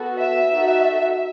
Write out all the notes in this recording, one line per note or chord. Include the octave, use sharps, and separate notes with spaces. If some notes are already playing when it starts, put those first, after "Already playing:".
Already playing: B3 F#4 A4
E5
D#4 F#4 A4